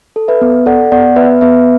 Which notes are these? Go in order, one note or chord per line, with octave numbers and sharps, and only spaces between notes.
A4
B4 E5
B3
A4 D5 F#5
B3 D5 F#5
B3 B4 E5
B3 B4 E5